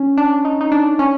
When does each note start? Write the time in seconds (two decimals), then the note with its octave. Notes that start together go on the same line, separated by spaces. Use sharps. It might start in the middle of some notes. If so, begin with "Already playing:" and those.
Already playing: C#4
0.18 D4
0.45 D#4
0.61 D#4
0.72 D4
0.99 C#4